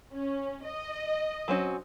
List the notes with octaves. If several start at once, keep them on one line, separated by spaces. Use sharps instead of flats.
C#4
D#5
F#3 C4 C#4